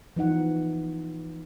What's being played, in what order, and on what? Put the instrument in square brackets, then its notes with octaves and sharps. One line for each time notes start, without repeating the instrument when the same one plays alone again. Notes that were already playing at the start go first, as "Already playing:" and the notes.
[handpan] E3 F3 D#4 F#5